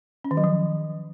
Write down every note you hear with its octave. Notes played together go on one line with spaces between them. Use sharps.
C#4
D#3
F#3
F3